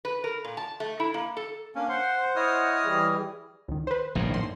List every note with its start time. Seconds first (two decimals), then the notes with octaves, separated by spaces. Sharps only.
0.05 B4
0.24 A#4
0.45 A#2
0.57 A5
0.80 A3
1.00 E4
1.14 A#3
1.37 A4
1.75 A#3 C#4 D4
1.89 C5 F#5 C6
2.36 E4 C#5 D#5 D#6 F6
2.85 E3 G3 G#4
3.68 C#2 D#3
3.87 B4 C5
4.15 A#1 F#2 A2
4.30 D#3 A#3 C6